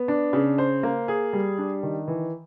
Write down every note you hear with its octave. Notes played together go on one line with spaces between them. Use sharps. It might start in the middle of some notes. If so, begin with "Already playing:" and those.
Already playing: B3
D4
C#3
C5
A#3
G#4
G3
D4
D#3
E3